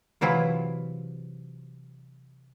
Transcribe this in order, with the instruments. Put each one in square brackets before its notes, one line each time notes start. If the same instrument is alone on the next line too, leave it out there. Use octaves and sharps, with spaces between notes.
[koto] C3 E3 F#3 E4 F4